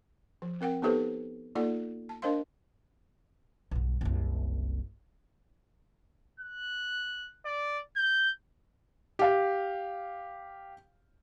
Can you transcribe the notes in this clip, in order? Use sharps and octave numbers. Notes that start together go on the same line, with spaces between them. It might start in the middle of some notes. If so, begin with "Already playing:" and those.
F3
C4 A#4 F#5 G5
B3 D#4 G4 A4 B4 C5
A#3 D#4 F4 A4 D5 F#5
A5
D4 A#4 C5 D#5 F5 C6
B1 G2
F#1 C2
F#6
D5
G6
G4 F5